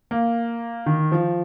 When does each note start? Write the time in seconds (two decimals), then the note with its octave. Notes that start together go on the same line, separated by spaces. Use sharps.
0.11 A#3
0.86 D#3
1.12 F3